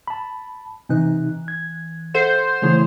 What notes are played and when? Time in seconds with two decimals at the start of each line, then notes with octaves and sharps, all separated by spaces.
0.08 A5 B5
0.89 C3 E3 D#4 F#6
1.48 G#6
2.14 A4 C5 E5 F#5
2.62 C#3 E3 A3 E4 G#4 C#5